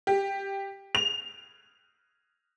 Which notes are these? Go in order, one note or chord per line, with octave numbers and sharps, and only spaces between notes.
G4
F7